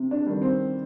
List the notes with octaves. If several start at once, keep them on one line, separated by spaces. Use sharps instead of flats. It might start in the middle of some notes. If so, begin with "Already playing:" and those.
Already playing: C3
D4
D#3 G3
C4